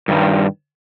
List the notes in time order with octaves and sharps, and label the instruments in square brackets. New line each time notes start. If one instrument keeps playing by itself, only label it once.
[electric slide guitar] G2 D#3 G3